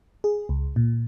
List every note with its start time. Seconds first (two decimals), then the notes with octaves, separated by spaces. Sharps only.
0.24 G#4
0.49 C#2
0.76 A#2